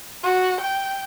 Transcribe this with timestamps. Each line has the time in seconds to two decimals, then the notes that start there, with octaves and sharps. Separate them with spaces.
0.23 F#4
0.61 G5